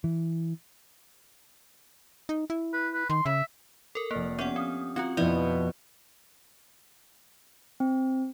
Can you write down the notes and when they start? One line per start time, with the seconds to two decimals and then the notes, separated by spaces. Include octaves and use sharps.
0.04 E3
2.29 D#4
2.50 E4
2.73 B4
2.94 B4
3.10 D#3 C6
3.26 C#3 E5
3.95 A4 A#4
4.11 F1 A#3 D5 F6
4.39 B3 C#4 G4 F#5 F#6
4.56 C4 D#6 F6
4.96 C4 F4 F#4 F#5
5.17 F2 B2 F3 E4 D5
7.80 C4